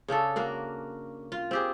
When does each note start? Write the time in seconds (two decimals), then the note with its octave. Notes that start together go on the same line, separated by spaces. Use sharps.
0.08 C#3 C#4 D4 A4
0.36 A#3 F#4 A#4
1.32 F4
1.51 C4 G4 G#4